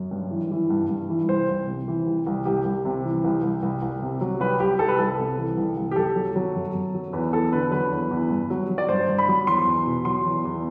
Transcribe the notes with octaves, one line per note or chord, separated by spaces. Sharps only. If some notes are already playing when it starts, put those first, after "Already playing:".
Already playing: F#2
G2
E3
E3
G2
G2
E3
C2 C5
C2
C3
E3
C2
C2
C2 G4
C2
C3
E3
C2
C2
C2
C2
C3
F#3
C2 B4
C2 G4
C2 A4
B4
C2 A4
C3
E3
C2
C2
G4
F#2 A4
F#3
F#3
F#2
F#2
F#3
E2 B4
E2 A4
D3 B4
F#3 B4
E2
E2
G2
F#3
F#3
D5
G2 C5
G2
B5
F#3
E2 C6
E2
B2
F#3 C6
E2
E2